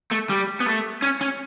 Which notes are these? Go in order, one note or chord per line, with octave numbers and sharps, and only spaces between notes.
A3
G3
B3
A3
C#4
C#4